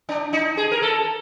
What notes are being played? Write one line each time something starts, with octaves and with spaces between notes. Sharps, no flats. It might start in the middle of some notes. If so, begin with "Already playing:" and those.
D4
D#4
G#4
A#4
A4